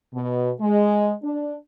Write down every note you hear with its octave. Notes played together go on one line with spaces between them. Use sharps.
B2
G#3
D4